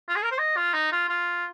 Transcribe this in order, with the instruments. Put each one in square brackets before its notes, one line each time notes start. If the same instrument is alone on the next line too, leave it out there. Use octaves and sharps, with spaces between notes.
[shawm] F4
G#4
A#4
C5
D#5
F4
D#4
F4
F4